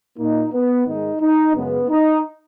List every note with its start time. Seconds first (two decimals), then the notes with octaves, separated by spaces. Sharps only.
0.18 A#2 A#3 D#4
0.53 B3
0.86 G#2 D#3 G#3 D#4
1.21 D#4
1.54 F#2 C#3 G#3 B3
1.89 D#4